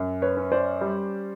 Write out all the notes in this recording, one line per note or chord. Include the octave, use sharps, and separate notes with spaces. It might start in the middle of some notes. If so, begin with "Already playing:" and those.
Already playing: F#2
B4 C#5
C#4
C5 D5
G3